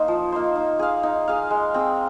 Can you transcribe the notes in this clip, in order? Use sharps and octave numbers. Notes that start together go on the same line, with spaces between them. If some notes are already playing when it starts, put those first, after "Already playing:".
Already playing: A#3 D#4 C5
F3
A#3 D#4 C5
D#4
G#4 F5
D#4
G#4 F5
G#3
C4 G#4